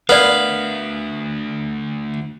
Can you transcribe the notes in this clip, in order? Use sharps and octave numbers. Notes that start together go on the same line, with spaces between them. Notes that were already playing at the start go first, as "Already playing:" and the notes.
D2 B3 A#4 D5 F5